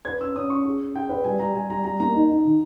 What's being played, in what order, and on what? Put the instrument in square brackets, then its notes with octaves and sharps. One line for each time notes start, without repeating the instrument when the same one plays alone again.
[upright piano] B4 [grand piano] G#6
[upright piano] C#4 [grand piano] E6
[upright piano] C#4 [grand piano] D#6
[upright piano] C#4 [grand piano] C#6
[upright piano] G#4
C#4
[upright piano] G#4 [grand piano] G5
[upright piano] B4
[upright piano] G3 [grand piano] G#5
[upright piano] G3 [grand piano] A#5
[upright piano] G3 [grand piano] G#5
[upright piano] G3 [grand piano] A#5
[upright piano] G3 [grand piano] A#5
[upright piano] A#3 [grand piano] A#5
[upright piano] D#4
D#4
D#3